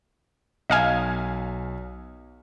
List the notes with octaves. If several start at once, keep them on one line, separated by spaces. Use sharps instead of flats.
B1 D#5 F5 G#5